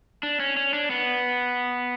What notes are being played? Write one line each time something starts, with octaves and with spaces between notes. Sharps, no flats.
D4
C#4
C#4
D4
B3